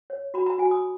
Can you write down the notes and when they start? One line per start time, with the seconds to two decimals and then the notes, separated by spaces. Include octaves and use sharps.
0.10 C#5
0.34 F#4 B5
0.46 A#5
0.58 F#4 G#5
0.71 D#6